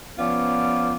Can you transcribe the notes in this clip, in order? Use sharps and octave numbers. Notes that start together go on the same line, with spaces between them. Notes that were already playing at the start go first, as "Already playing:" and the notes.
F3 B3 C#4 F4 D5